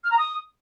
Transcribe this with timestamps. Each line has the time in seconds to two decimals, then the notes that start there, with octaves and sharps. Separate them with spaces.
0.04 F6
0.11 A#5
0.18 D#6